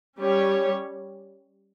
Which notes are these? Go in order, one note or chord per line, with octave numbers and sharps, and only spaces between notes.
G3 C#4 G4 C#5